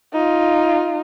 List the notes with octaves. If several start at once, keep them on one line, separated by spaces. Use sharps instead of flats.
D#4 F4